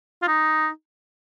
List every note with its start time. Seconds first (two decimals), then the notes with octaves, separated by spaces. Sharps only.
0.22 F4
0.27 D#4